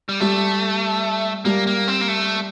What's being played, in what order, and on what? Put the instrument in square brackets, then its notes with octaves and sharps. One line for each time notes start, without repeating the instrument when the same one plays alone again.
[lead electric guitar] G3
[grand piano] G3 [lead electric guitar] A3
[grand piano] G3 [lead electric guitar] A#3
[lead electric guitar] A#3
C4
A#3
A3